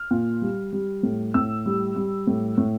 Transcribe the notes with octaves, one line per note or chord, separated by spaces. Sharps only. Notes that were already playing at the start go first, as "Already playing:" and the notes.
Already playing: F6
A#2
G3
G3
A2
A2 E6
G3
G3
A2
A2